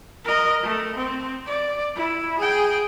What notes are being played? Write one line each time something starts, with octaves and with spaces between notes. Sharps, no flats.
A#4 D#5
A3
C4
D5
E4
G#4 G5